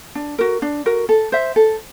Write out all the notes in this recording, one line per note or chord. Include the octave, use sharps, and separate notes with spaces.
D4
F#4 A#4
D4
F#4 A#4
A4
C5 E5
A4